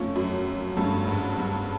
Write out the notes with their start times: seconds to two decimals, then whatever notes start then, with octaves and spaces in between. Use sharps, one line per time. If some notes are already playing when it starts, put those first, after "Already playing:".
Already playing: F2 F3 A3 C#4 F4
0.15 F#2
0.77 G2 F3 A3 C#4 F4
1.07 G#2
1.38 G2